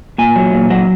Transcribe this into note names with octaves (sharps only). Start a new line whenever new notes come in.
A#2 G#5
F#3
A#2
F#3 F#5